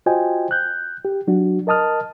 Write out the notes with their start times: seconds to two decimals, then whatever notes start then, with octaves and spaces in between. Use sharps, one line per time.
0.06 F4 F#4 C5 D#5 G5 G#5
0.51 F#6 G6
1.05 G4
1.27 F#3 D4 F#4
1.67 A#4 D#5 A5 D#6 F6